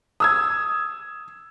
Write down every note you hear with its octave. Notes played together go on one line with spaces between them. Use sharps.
D#6 E6 G#6